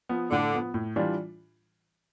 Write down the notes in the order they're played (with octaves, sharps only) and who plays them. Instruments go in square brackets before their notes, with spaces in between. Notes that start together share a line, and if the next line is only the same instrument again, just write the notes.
[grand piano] F3 B3
[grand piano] A2 [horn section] D3
[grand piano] F3 B3
A2
E3 G3 D4 F4